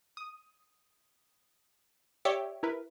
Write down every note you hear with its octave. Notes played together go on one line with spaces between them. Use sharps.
D#6
G4 C#5 D5 E5
E4 A#4 B4